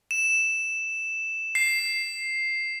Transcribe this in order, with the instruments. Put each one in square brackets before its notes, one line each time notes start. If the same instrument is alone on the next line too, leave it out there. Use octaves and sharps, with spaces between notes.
[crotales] E7
C7